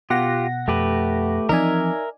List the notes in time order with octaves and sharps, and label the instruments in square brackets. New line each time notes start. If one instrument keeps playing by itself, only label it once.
[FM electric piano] B2 F#5 A#6 [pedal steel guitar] F4 G4
[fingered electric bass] F2 [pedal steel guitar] A3 G4 B4
[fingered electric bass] E3 F3 C4 [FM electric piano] D#4 D5 G#5 [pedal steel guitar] A#4 E5